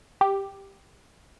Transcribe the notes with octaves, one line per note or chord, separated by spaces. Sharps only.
G4